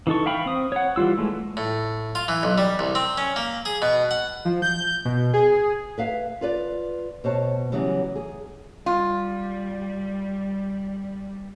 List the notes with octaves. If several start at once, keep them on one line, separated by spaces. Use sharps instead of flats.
E3 D#4 A4 C#6
E5 F5 G5 B5 C#6
C4 D#6
C#5 F#5
E3 G3 F4 E6
E3 G#3 A3
A2
F4
E3
B1
G3
C2
C4
C#4
A#3
G#4
B2
F#5
F3
G6
B2
G#4
B4 E5 F5
F4 B4 D5
B2 C5 C#5 A5
C#3 E3 F#3 G3 B3
G#4
G3 F4